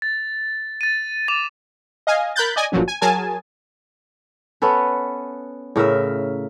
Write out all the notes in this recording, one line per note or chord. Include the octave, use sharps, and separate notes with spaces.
A6
A6 D#7
D6 A6 E7 F7
D#5 F5 G#5
A#4 B5 F#6 G6 A6
D5 D#5 G#5
G1 A#2 F3 F#3 C#4
G#5
F#3 G#4 A#4 G#5 A5
B3 C#4 A4 B4
A2 C#3 A#4 E5